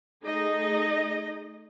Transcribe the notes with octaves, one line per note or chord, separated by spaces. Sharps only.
A3 D#4 G#4 D#5